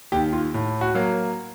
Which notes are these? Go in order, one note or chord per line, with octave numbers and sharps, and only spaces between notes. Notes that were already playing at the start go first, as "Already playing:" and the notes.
D#2 D#3 G4
F4
A2
F#4
F#3 A#3